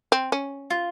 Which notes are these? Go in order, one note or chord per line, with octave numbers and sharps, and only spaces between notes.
C4
C#4
F4